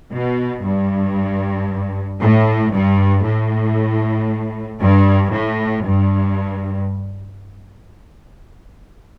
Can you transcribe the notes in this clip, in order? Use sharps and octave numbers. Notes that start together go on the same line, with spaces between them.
B2
G2
A2
G2
A2
G2
A2
G2